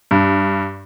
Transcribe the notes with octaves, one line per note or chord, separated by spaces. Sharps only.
G2